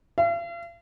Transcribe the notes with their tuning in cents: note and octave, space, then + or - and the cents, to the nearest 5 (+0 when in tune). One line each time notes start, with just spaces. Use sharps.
F5 -45